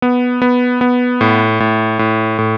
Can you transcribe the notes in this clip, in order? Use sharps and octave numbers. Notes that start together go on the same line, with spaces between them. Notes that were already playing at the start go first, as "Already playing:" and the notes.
B3
B3
B3
A2
A2
A2
A2